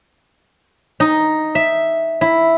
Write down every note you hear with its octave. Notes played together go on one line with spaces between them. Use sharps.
D#4
E5
E4